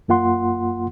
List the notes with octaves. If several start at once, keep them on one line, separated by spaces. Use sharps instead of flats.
F#2 A#3 F4 F#5 C6